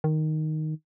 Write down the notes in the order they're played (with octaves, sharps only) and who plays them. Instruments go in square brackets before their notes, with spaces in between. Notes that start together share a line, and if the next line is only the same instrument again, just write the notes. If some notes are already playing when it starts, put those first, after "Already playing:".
[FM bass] D#3